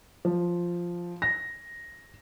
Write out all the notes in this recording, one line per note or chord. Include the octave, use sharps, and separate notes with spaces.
F3
A#6